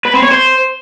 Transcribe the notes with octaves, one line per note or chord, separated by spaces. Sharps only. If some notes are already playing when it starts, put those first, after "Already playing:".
B4
C4
C#5
C5